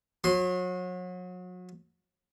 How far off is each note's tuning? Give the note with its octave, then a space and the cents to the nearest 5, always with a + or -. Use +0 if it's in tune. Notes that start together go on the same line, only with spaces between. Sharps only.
F#3 -35 C6 +0